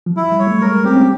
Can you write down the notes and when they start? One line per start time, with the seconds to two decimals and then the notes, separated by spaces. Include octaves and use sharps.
0.06 F3
0.16 F#3 E4
0.32 G3
0.39 C#5
0.47 A3
0.61 G#3 A#4
0.85 C4 G4
0.95 C#4